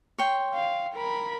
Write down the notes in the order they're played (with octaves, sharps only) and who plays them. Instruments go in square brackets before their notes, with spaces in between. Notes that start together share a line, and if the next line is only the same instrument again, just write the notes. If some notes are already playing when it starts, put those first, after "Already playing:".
[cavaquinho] C#5 G5 C6
[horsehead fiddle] F5
A#4 B5